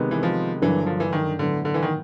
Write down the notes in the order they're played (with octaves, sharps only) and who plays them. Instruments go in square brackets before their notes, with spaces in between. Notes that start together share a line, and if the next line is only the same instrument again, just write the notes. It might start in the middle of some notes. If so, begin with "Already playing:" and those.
Already playing: [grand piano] C3 D#3 G#3 B3
[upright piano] E3
F3
[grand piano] G2 D3 F#3 A#3 D4 [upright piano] E3
[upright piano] F3
E3
D#3
[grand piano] A2 F#3 B3 [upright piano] D3
[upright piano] D3
E3
D#3